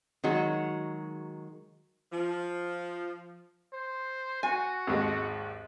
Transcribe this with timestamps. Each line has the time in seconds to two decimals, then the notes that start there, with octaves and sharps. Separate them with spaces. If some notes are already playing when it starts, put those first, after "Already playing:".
0.24 D#3 F#3 G#3 F#4
2.12 F3
3.73 C5
4.43 F#4 G#5
4.87 G#1 D#2 G#3